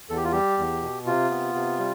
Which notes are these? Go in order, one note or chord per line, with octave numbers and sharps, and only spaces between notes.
E2 A4
G4
F4
G3 G4
E2
B2
C3 F4
B3
C3
G3